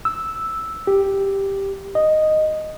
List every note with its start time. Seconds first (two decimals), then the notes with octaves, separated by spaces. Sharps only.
0.05 E6
0.87 G4
1.95 D#5